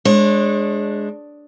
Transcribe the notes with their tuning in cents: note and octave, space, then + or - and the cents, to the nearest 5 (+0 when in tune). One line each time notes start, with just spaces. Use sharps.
G#3 +0 D4 +0 C#5 -35